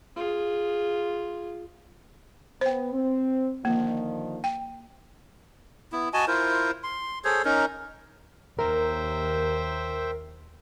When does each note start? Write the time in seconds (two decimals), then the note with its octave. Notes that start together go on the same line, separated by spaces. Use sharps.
0.16 F4 G#4
2.61 B3 C5 G5
2.93 C4
3.65 D3 D#3 F3 A#3
4.44 G5
5.92 B3 E4
6.14 F#4 D#5 G#5 A5
6.28 E4 F4 A#4 C5
6.83 C6
7.25 G#4 A4 C5 C#5
7.45 C#4 D#4 A#4
8.59 D#2 A#4 C5 E5 G5